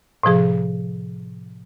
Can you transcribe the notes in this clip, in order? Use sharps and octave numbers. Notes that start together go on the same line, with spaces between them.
A2 C3 F3 G#4